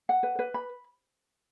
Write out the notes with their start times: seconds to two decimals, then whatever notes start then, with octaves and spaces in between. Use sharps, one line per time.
0.09 F#5
0.23 B4
0.39 B4
0.54 B5